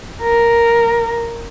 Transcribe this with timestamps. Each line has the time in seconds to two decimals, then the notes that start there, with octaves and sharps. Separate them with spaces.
0.23 A#4